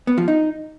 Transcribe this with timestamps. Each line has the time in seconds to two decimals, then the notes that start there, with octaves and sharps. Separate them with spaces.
0.07 B3
0.18 F3
0.28 D#4